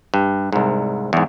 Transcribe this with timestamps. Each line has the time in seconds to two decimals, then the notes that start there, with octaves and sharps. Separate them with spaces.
0.14 G2
0.52 C2 G#2
1.13 E2 G#2